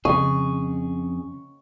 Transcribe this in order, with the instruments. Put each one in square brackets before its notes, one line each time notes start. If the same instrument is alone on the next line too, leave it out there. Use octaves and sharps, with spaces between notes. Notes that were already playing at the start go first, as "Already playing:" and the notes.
[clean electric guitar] F2 G#4 [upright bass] C#3 [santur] C#6